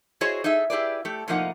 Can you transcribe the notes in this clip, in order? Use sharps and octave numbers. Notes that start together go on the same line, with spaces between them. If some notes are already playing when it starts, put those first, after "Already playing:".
E4 F#4 G#4 C5 C#5 D#5
D#4 G#4 A4 E5
E4 G4 G#4 B4 D5
A3 G4 A4
A2 C3 F3 A#3 D#4 F#5